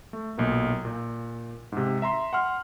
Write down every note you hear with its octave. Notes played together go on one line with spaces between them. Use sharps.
A3
B1 A#2 A#3
A#2
G#2 C3
E5 A#5 C6
F#5 C6 F6